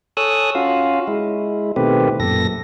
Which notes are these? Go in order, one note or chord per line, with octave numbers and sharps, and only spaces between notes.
A4 C#5 G#5 D#6 E6 F#6
C#4 F4 F#4 F5
G#3 E4
B2 D#3 A3 C4 G4 B4
F#2 A#2 A4 A#6